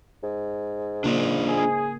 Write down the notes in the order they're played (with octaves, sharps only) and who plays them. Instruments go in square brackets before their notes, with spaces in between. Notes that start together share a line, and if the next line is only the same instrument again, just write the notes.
[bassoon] G#2
[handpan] C#3 A#3 C#4 [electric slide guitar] D4 F4 D5
[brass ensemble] G#4